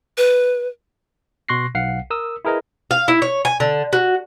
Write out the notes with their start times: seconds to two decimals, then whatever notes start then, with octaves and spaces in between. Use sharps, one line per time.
0.17 B4
1.49 B2 C6 C#6 F#6 A#6 C7
1.75 B1 F5 F#5 C7
2.10 A#4 D#6 E6
2.45 E4 G#4 A#4 B4 D#5
2.91 F5
3.08 E4
3.22 C#5
3.45 G#5
3.60 D3
3.93 F#4